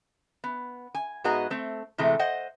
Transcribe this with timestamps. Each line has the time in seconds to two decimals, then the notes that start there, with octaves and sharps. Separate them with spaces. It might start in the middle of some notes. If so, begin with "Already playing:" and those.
0.44 B3
0.95 G#5
1.24 G#2 B3 F#4 G#4 D#5 A#5
1.50 A3 C4
1.98 A2 C3 E3 G#3 A3
2.19 C5 D#5 F#5